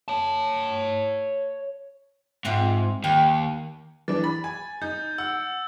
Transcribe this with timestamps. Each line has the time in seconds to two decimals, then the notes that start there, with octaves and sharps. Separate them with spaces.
0.08 C#5 A5
2.45 G#2 C4 F4 E5
3.04 D#2 G5
4.08 E3 D4 A6
4.24 B5 A6
4.44 G#5
4.82 D#4 G6
5.18 F#5 E6